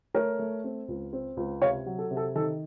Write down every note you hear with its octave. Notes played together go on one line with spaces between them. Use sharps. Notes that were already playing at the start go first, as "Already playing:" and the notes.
A3 A#4 C#5
A3
C4
C#2
C4
C#2
C3 C#5 F5
F#3
A4
C3
A4
D#3 A4